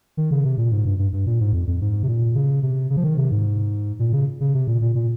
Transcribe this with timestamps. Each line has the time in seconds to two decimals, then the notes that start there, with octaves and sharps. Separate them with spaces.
0.17 D#3
0.31 C#3
0.45 C3
0.58 A#2
0.72 G#2
0.85 G2
0.99 G2
1.13 G2
1.26 A#2
1.40 G#2
1.53 F2
1.67 F2
1.81 G#2
2.03 C3
2.08 A#2
2.35 C#3
2.62 C3
2.90 C#3
2.97 F3
3.04 D#3
3.17 C3
3.31 G#2
3.99 A#2
4.13 C#3
4.41 C#3
4.54 C3
4.67 A#2
4.81 A#2
4.95 A#2